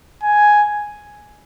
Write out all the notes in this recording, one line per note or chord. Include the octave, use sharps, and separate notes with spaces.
G#5